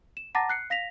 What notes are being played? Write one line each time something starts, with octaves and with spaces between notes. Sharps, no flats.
E7
F#5 A5 A#5 D6 A6 A#6
F#6 C7 C#7
F5 A#6 B6 F7